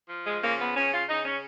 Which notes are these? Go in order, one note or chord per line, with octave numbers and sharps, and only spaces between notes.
F3
G#3
C#3 A#3
B3
C#3 C#4
F4
C#3 D#4
C#4